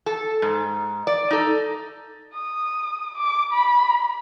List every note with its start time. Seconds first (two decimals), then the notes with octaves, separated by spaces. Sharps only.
0.06 A4
0.42 G#2
1.07 D5
1.31 D#4 A4
2.34 D#6
3.18 D6
3.53 B5